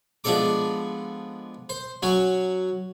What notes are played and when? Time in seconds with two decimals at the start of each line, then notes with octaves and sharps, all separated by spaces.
0.24 F3 G#3 B3 D4 A4 D6
1.69 C5
2.02 F#3 C#4 F#4